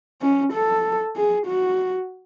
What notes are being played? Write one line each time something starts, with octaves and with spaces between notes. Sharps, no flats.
C#4
A4
G#4
F#4